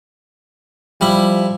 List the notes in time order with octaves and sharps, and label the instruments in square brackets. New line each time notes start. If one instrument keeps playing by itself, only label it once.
[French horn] F3 [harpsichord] G3 E4 B5